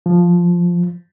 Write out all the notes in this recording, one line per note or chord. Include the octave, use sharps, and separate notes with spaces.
F3